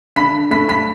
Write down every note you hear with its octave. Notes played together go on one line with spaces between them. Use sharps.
D3 B5 B6
A3 B5 B6
B5 B6